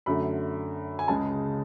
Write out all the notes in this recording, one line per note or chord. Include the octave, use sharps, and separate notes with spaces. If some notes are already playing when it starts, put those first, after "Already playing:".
F#2 D3 A3 B5
G#5
C#2 C#3 G#3 A5